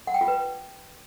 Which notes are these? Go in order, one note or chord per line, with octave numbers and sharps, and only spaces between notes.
F#5
G5
F4
B4